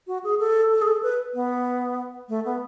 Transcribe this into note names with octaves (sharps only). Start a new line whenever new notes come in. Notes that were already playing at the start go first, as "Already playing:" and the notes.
F#4
G#4
A4
A4
G#4
A4
B4
B3
A3
B3